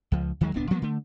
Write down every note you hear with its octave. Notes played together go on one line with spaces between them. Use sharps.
C#2 F3
D#2 D#3 F#3 G#3
D1 C2 B3 D4
F3 G3 A#3 B3
D3 A3